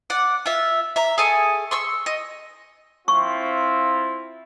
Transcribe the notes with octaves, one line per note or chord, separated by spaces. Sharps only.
D5 F#5
F4 E5
E5 A#5
G#4 A4 G#5 C#6
C6 C#6 E6
D#5
C4 E4 F4 C#6